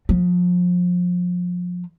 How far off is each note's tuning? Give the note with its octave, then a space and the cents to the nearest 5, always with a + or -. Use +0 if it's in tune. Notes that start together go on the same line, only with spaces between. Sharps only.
F3 +30